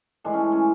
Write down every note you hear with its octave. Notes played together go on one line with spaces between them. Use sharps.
A2 E3 G#3 D4
C#4
C#4